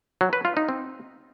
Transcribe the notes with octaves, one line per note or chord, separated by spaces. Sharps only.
F#3
B4
F4
D#4
C4